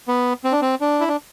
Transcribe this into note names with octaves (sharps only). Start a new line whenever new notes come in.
B3
C4
D4
C4
D4
E4
D4